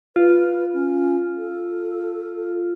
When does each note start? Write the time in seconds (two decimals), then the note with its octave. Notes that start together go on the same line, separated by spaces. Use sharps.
0.16 F4 B4
0.73 C#4
1.37 A4